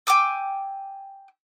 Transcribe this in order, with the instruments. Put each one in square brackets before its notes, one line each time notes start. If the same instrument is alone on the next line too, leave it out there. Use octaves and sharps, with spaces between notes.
[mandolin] G5 G#5 D6 E6